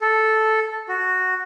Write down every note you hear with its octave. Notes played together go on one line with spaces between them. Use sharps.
A4
F#4